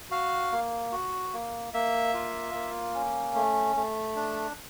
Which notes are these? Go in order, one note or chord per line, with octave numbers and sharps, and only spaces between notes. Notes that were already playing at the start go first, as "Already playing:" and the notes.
F#4 F5
A#3
F#4
A#3
A#3 E5
F4
A#3
C#4
A3
A3
D4